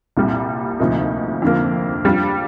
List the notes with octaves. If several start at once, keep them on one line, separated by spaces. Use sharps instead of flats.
C2 A#2 G3 C4
D2 C3 F3 A#3 D#4
F2 D3 F3 A#3
G3 D4 F4